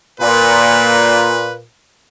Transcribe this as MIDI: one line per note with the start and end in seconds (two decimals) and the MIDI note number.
0.20 1.63 46
0.20 1.56 71